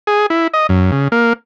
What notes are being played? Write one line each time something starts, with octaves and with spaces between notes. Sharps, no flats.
G#4
E4
D#5
F#2
C#3
A#3